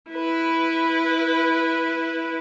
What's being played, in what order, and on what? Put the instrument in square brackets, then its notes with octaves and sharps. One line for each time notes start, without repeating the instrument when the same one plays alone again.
[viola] E4 B4